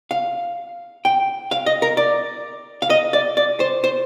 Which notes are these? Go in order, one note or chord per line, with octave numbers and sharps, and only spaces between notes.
F5
G5
F5
D#5
A#4
D5
F5
D#5
D5
D5
C5
C5